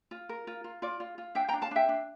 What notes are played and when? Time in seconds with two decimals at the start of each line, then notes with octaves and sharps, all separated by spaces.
0.11 F4
0.29 A#4
0.47 F4
0.64 F4
0.82 F4 D5
1.00 F4
1.18 F4
1.35 D4 E5 G5
1.48 G5 A#5
1.53 D4
1.62 F5 A5
1.71 D4 E5 G5
1.89 D4